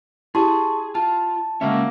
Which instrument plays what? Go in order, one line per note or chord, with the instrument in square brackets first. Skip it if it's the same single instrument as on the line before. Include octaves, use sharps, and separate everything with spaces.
[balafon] E4 G4 [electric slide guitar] G#4 [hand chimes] A5 C6 C#6
[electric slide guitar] F4 [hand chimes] A5
[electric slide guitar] C#3 G#3 C#4 [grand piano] A#3 F#4 E5